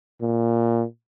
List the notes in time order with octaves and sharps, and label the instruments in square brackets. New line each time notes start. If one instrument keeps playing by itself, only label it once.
[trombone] A#2